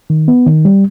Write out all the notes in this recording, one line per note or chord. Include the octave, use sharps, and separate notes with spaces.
D#3
B3
D#3
G3